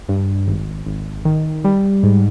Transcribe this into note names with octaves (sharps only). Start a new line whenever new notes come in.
G2
G#1
G#1
D#3
G3
G#2